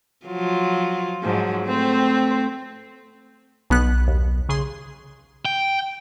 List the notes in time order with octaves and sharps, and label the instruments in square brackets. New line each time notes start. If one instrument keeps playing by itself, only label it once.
[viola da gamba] F3 F#3 F4
[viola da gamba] G#2 F#3 [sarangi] F3
[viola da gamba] A3 C5 [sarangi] C4
[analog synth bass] B1 [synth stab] B2 B3 F#6
[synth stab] D#2
C#3 G#4 C6
[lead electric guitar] G5